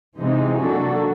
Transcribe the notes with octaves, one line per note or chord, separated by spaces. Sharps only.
C3 E3 G#3 C4 D#4
F#3 A#3 D4 F#4 A4